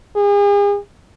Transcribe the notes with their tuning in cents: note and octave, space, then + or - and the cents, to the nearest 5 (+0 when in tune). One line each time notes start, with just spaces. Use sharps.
G#4 -40